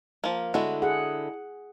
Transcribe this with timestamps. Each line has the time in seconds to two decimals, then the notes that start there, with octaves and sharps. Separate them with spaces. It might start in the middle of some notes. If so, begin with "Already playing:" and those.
0.24 F3 A#3
0.54 D3 G#3 E4 F#4 A4
0.82 G#4 F#5